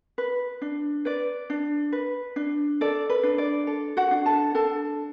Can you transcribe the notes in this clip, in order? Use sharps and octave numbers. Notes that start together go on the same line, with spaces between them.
B4
D4
B4 D5
D4
B4
D4
A4 D5
B4
D4
D5
A4
F#4 F#5
D4
A4 A5
D4 A4 A5